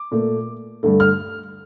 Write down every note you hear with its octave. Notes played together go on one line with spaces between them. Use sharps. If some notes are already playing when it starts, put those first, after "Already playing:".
Already playing: D6
A#2 A3
G2 D3 A3
F6